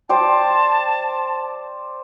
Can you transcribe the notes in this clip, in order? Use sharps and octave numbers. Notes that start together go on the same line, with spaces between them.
C5 D5 G5 A5